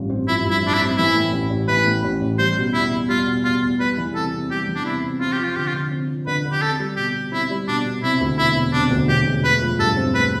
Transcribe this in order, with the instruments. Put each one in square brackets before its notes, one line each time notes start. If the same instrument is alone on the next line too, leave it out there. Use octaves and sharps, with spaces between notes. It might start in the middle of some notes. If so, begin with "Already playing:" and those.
Already playing: [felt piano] A1 G2 F3
C4
[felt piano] F3 [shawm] E4
[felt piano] G2
[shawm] E4
[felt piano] A1 [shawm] D4
[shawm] E4
[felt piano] C4
[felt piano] E3 [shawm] E4
[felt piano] A2
A1
A1
[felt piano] E3 [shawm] B4
[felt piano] A2
A1
A1
[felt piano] G3 [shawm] C5
[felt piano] B2
[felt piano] E2 [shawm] E4
[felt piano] E2
[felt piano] G3 [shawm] F4
[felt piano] B2
[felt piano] E2 [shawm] F4
[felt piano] E2
[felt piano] G3 [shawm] B4
[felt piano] E3
[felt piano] C3 [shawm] A4
[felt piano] C3
[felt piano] G3 [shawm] G4
[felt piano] E3
[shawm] D4
[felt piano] C3 [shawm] E4
[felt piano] C3
[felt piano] C4 [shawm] F4
[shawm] G4
[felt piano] F3 [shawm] F4
[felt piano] D3 [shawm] G4
[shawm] F4
[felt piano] D3
C4
F3
[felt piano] D3 [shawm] B4
[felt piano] D3
[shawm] G4
[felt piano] C4 [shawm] A4
[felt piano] G3
[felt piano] B2 [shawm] G4
[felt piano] B2
[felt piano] C4 [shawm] E4
[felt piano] G3
[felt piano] B2 [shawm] D4
[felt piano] B2
[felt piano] C3 [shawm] E4
[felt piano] D2
[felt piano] E1 [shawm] E4
[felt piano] E1
[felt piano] C3 [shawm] D4
[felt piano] D2
[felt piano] E1 [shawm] G4
[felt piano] E1
[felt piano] A3 [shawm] B4
[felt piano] F3
[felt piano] G2 [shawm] A4
[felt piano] C4
[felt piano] A3 [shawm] B4